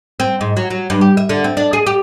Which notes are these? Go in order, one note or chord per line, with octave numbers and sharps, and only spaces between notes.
C4
G#2
F#3
F#3
G2
G4
E5
D3
C4
D4
G#4
G4